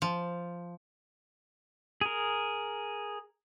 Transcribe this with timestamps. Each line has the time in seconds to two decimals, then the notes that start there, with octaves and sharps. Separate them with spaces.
0.02 F3
2.01 G#4 A#4